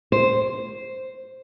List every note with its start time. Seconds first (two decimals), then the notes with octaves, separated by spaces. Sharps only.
0.12 C5